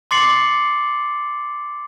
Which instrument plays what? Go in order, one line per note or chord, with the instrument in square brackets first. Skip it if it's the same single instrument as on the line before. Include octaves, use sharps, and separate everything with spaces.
[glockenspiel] C6 D6 A6 C7 C#7 F#7